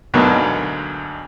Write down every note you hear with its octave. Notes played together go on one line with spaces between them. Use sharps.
D2 G#2 B2 F#3 A#3